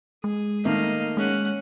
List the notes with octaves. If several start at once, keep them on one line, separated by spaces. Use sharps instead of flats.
G#3 G#4
D#3 A3 A#3 D#5 F5
G#3 C#4 F#5